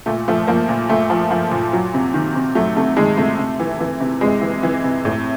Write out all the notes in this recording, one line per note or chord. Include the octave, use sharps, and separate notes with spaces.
A#2 A3
F3 A3
F3 A#3
A#2
A#2 A3
F3
F3
A#2
F#3
C3
D#3
C3
F#3 A3
C3 A3
D#3 G#3
C3 A3
C3
E3
E3
C3
C3 G#3
E3
E3
C3
A2